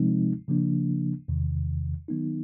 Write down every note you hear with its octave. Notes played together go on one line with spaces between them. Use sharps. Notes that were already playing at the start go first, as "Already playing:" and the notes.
Already playing: C3 F3 G#3 C4 D#4
C#3 F3 A#3 D4
E2 C3 D#3
D#3 F#3 B3 D#4